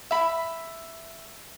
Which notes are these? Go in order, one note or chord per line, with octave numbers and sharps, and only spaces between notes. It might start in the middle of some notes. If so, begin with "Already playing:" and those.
E5 B5